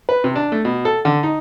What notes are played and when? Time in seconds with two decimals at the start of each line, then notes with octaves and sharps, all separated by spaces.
0.09 B4
0.24 C3
0.35 D4
0.52 A3
0.65 B2
0.85 A4
1.05 D3
1.23 D#4